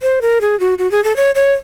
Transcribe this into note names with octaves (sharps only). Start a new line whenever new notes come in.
C5
A#4
G#4
F#4
F#4
G#4
A4
C#5
C#5